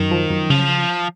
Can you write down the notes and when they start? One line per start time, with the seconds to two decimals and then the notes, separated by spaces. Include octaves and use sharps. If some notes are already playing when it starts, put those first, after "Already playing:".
Already playing: F#2 D#3
0.11 F3
0.30 F#2
0.50 C#3 F3